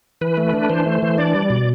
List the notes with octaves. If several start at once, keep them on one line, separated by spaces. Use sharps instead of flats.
E3 B4
A3
D4
E3 C5
A3
E3
D4 D5
G3
B2